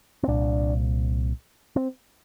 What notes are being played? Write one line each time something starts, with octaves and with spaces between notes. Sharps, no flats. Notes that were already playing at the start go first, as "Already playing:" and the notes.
C4
C2 A#2 D4
C4